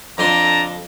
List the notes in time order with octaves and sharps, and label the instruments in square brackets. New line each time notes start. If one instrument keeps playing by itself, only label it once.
[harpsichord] F2 C6 [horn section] D3 A5 A#5